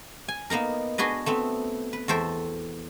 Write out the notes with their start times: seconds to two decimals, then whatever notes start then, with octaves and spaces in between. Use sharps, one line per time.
0.28 G#5
0.50 A#3 B3 D#4 A#4
0.98 D4 F#4 G#4 B4 D#5
1.26 A3 B3 C4
1.93 B4
2.08 E2 F#4 A4 C5 E5 G5